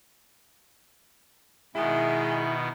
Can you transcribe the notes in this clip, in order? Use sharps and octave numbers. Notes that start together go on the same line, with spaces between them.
B2 D#3 G#3 B3 E4 E5